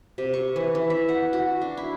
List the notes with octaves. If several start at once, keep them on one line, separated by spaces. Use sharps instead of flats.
C3
C#6
E3
E3
E5
F#5
F#4
D4
E4